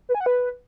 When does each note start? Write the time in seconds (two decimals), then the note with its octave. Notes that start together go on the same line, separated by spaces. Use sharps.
0.09 B4
0.15 G#5
0.20 F#5
0.26 B4